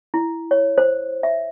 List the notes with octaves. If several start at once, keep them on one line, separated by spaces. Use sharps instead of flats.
E4
C#5
C5
E5